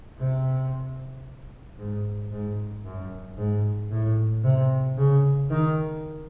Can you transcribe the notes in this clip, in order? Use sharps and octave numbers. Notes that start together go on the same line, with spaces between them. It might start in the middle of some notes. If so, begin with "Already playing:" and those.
C3
G#2
G#2
F#2
G#2
A2
C3
C#3
D#3